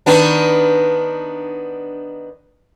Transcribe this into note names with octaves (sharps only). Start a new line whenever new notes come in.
D#3 B3 D4